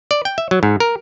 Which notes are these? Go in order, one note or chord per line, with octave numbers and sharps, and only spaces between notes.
D5
G5
E5
F#3
G#2
A#4